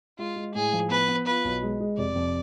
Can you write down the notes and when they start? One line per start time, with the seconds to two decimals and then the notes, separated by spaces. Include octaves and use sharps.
0.18 G#3 F4
0.36 G#3
0.54 A2 G#4
0.73 F3
0.90 B3 B4
1.08 B3
1.27 F4 B4
1.45 B1
1.63 G#3
1.80 G#3
1.98 F1 D5
2.16 F2